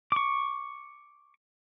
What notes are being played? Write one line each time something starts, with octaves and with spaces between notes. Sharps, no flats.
C#6 D6